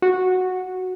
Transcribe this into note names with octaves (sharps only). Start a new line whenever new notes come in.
F#4